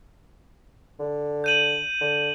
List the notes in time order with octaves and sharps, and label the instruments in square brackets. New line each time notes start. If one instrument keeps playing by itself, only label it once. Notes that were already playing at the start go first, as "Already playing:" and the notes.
[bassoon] D3
[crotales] G6 D#7 F#7
[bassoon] D3